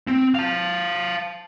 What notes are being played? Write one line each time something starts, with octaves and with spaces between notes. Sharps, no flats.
C4
F5 A5